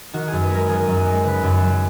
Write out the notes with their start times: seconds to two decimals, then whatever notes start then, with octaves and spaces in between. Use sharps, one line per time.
0.13 D#3 F#4
0.28 F#2 G#4
0.41 B4
0.50 G#3 A#4
0.68 D#3 G#4
0.87 F#2
1.06 G#3
1.24 C#3 B4
1.43 F#2
1.62 F#3